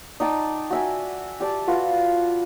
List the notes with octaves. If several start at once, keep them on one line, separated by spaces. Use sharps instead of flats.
D#4 D5 G5 A5
F#4 E5 G#5
G4 D5 A5
F4 F#4 B4